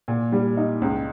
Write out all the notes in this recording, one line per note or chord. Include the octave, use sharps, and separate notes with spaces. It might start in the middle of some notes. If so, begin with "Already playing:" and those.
A#2
G3
D#4
C#2